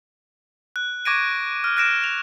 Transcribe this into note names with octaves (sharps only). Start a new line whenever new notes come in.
F#6
C#6 D6 G#6 A#6 D7 D#7
F6
F6 F#6 A#6 D7 E7
F7